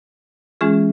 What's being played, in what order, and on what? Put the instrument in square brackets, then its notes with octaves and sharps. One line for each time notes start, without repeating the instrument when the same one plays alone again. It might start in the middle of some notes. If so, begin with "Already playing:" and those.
[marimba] E3 G#3 C#4 F4 G#4